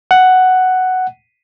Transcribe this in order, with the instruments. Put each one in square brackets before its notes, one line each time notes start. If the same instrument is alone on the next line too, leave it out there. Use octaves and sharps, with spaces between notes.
[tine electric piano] F#5